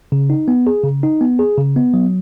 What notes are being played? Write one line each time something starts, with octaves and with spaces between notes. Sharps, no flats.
C#3
D#4
B3
G#4
C#3
D#4
B3
G#4
C#3
B3
F#3